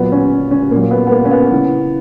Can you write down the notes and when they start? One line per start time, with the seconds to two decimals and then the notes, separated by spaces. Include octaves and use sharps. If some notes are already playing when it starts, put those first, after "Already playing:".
Already playing: A#2 F#3 B3
0.12 C#4
0.51 C#4
0.71 A#2 F#3 A#3
0.91 B3
1.07 B3
1.11 A#3
1.25 C#4
1.31 B3
1.51 C#3 E3